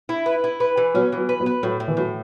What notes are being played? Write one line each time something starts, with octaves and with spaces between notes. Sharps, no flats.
E4
B4
E4
B4
E3
F#3 B3 C#4
E3
F#3 B3
B4
F#3 B3
B4
A2 F#3
A2
E3
A2 F#3